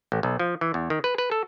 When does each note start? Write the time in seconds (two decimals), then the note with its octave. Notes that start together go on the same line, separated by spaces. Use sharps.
0.12 A1
0.23 B1
0.39 F3
0.61 E3
0.74 E2
0.90 D#3
1.04 B4
1.18 B4
1.31 A4